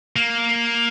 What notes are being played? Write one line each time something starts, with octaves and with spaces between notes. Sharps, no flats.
A#3